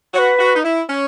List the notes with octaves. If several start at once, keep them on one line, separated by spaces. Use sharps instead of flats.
F#4 B4 C#5
F#4
D#4
E4
C#4